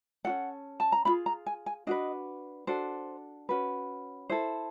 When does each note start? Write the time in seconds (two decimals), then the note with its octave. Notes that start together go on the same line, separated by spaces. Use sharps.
0.25 C#4 F#4 A4 F#5
0.80 A5
0.92 A#5
1.05 D4 F4 G#4 B5
1.26 A#5
1.46 G#5
1.66 G#5
1.87 D4 F#4 B4 D#5
2.67 D4 F#4 A4 C5
3.49 C#4 F#4 B4
4.30 E4 A4 C5